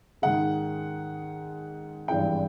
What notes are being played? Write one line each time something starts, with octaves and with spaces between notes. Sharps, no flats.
G#2 D#3 G#3 F#5
G#1 G2 E3 G#3 G5